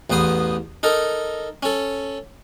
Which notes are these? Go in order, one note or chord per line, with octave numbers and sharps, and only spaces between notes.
A1 E2 B3 C5 D#6
D#4 A4 A#4
C#4 A4